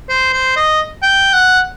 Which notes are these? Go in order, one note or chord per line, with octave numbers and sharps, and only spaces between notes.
C5
C5
D#5
G5
F#5